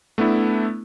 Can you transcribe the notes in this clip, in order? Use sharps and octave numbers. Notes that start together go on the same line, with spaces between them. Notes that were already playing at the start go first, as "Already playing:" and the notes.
A3 B3 D4 E4